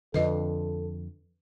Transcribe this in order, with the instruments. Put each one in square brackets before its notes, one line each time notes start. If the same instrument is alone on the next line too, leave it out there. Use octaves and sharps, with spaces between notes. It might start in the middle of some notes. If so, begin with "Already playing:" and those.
[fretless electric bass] F2 D3 [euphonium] A4 [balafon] B4 D#5